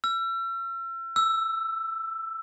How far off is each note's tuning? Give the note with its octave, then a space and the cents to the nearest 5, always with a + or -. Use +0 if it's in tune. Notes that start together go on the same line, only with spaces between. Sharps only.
E6 +40
E6 +5